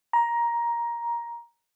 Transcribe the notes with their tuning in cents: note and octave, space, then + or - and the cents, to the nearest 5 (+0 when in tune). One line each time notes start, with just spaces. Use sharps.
A#5 +15